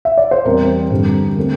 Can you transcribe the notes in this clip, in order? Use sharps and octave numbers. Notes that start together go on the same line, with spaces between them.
E5
D5
C5
E2 E3 G3 C4 A#4
G2 D3 G3 C4
D3 A3 C4